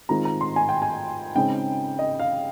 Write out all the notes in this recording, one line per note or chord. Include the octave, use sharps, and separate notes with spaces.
D#3 G#3 C4 F4 A#5
A#5
C6
G#5
G5
G#5
C#3 G#3 C4 D#4 G5
D#5
F5